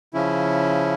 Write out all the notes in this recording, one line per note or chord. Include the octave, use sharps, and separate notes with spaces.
C#3 F3 C#4 E4